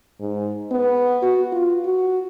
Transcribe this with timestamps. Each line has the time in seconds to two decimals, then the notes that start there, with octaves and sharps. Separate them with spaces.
0.20 G#2
0.71 B3
1.22 F#4
1.52 F4
1.85 F#4